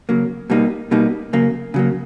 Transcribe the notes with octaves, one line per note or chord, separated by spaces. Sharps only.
C#3 F#3 A#3
B2 G3 A#3 D#4
B2 G3 A#3 D#4
C#3 F#3 A#3
C#3 F#3 A#3